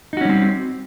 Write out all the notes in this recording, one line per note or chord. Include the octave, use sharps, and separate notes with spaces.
G3 C4 C#4 D#4 F#4